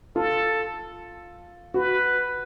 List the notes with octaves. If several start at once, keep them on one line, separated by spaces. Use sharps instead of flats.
F4 A4
F#4 B4